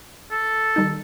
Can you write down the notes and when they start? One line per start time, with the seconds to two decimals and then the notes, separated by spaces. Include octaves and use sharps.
0.31 A4
0.76 D#3 G3 D#4